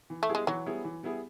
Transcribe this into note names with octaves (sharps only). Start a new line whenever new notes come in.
E3
A3
G3 B3 E4 G#4
G#3
E3 F#3
G3 B3 E4 G#4
E3
G3 B3 E4 G#4